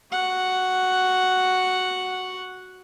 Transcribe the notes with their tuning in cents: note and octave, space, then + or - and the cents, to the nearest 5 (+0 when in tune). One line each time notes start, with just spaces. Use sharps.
F#4 +0 F#5 +0